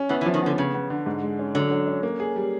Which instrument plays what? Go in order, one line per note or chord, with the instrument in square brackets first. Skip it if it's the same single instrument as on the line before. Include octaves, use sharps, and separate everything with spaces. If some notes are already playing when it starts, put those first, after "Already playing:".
Already playing: [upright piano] C#4
[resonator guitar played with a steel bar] E3 [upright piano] B3
[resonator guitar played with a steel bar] E3
[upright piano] F3
[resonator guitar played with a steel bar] D#3
[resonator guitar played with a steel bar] D3 [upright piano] B3
[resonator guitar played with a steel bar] C#3 [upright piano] B3
[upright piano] B3
D3
G#2
G#3
C#4
[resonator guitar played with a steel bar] D3 [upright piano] F#3
[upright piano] F#3
C#4
A#3
G#4
G3